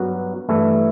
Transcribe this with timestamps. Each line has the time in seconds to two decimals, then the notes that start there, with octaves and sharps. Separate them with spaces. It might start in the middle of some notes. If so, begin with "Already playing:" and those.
Already playing: G2 F#3 B3 F#4
0.49 G2 E3 A3 E4